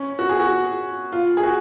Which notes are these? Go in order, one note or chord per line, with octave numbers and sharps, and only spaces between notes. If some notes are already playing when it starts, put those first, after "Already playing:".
Already playing: C#4
F#4
G#4
F#4
F4
G#4
F#4